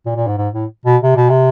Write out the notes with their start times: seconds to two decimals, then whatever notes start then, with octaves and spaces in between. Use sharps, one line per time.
0.06 A#2
0.16 A#2
0.27 G#2
0.38 G#2
0.54 A2
0.86 B2
1.02 C3
1.16 B2
1.30 C3